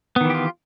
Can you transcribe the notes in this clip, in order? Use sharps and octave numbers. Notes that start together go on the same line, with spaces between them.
D#3 E3 B3 F4 G4